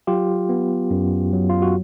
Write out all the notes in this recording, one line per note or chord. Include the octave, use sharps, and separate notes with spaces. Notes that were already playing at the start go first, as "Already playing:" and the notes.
F#3 F4 G4
B3
F#2
F#3
F4
F#4